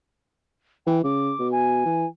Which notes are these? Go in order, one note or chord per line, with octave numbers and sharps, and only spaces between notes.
E3 G5
C#3 D6
B2
G#5
E3